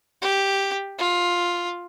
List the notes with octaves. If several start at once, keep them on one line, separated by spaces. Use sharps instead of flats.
G4
F4